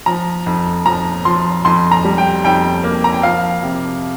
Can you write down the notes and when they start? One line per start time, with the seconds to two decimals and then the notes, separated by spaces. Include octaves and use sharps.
0.06 F3 A#5
0.46 F2
0.86 F3 A#5
1.25 F3 C6
1.65 F2 C6
1.91 A#5
2.05 G3
2.18 G5
2.44 F2 G5
2.84 A#3
3.04 A#5
3.14 G5
3.23 F3 F5
3.63 C3